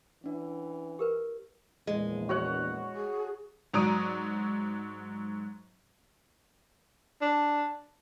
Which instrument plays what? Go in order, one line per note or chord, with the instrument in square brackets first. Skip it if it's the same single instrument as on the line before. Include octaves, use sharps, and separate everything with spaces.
[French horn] E3 [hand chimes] C#4 D4
[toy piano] G4 A#4 B4
[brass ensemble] A#1 E2 [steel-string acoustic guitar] G#3
[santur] F#4 C#5 F#5
[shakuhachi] G#4
[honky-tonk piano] G#2 F#3 D5 A#5 D#6 D7
[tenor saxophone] D4